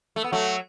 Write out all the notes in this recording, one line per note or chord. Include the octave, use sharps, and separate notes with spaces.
A3
B3
F#3 A3